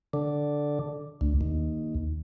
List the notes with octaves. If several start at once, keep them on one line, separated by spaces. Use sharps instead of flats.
D3
D2
D#2